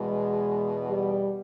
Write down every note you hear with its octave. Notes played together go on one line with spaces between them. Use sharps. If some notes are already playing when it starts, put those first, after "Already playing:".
Already playing: E2 B2 G#3
G3